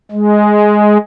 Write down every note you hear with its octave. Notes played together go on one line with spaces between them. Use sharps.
G#3